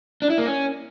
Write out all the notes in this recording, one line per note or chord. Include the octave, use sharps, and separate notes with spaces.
D4
E4
A#3
C#4